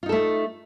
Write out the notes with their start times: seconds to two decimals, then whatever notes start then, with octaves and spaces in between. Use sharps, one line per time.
0.03 F4
0.06 D#4
0.09 A4
0.12 A3